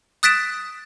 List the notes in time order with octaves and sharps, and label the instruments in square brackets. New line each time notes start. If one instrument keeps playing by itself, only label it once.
[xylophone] D#6 F#6 A6 B6 D7 E7